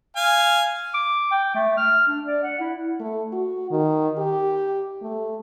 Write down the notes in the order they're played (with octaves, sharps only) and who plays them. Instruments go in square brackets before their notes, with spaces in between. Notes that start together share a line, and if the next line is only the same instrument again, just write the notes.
[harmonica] F5 G#5
[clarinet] D6
G5
A3
F6
D4
D5
F#5
E4
[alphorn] A3
F#4
D#3
G4
A3